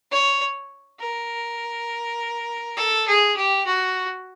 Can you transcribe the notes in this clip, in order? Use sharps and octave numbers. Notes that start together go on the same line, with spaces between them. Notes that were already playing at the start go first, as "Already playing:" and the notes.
C#5
A#4
A4
G#4
G4
F#4